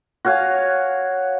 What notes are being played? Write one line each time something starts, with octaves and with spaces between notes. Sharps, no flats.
F#4 C#5 F5 G#5